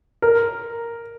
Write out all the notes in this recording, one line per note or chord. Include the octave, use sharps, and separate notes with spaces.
A#4